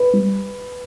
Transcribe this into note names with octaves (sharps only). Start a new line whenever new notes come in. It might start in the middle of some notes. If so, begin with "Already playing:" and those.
Already playing: B4
G3